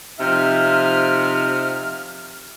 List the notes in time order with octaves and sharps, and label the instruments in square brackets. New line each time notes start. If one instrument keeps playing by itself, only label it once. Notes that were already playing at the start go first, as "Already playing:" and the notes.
[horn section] C3 F3 E5 [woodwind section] D#4 F6